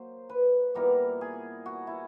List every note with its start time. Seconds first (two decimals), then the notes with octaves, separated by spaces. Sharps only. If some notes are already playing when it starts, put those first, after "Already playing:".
Already playing: F#3 A#3 C5
0.29 B4
0.75 A#2 G3 B3 E4 A#4
1.21 G#4
1.66 F#4
1.87 E4